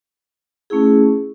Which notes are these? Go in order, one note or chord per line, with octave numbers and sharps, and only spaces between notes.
A3 C#4 E4 G#4